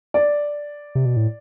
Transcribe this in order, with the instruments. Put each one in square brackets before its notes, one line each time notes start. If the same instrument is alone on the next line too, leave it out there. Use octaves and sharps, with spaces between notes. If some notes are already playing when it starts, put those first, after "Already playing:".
[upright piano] D5
[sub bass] C3
B2
A2